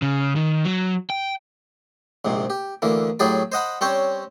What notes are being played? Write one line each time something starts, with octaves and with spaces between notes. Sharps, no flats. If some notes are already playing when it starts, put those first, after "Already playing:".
C#3
D#3
F#3
G5
A#1 G#2 C3
G4
D2 D3 E3 A#3
A2 F#3 G4 G#4 D5 B5
C5 D#5 F#5 B5
G3 C4 C#4 C5 C#5 G5